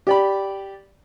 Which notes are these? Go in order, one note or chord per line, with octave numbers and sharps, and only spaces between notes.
G4 D5 B5